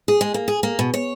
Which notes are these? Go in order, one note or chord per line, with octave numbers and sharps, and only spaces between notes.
G#4
G#3
A#3
G#4
A#3
B2
C#5